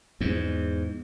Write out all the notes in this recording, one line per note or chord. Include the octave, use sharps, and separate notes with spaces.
E2 G#2